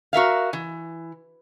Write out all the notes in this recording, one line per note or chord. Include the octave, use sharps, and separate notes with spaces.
F#4 A#4 E5 F5
E3